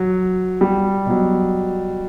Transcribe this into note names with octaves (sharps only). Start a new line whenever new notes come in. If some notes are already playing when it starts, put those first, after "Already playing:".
Already playing: F#3
G3
B2 F#3